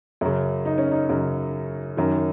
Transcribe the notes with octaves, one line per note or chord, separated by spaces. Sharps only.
F#2 C#3
D#4
C#4
D#4
F#2 C#3
F#2 D#3